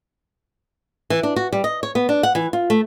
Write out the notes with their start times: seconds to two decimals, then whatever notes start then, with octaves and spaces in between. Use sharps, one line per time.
1.10 E3
1.23 D4
1.36 F#4
1.53 G3
1.64 D#5
1.83 C#5
1.95 B3
2.09 D4
2.23 F#5
2.35 E3
2.53 F4
2.70 A3